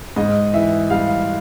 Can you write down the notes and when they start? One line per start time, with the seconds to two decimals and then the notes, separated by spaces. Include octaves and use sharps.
0.16 G#2 D#5
0.53 E3 E5
0.90 G3 F5